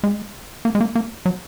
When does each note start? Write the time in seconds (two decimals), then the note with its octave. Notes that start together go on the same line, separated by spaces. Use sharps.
0.04 G#3
0.65 A#3
0.75 G#3
0.81 A#3
0.95 A#3
1.26 F#3